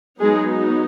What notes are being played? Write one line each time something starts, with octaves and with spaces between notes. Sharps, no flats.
F#3 G#3 B3 D#4 G#4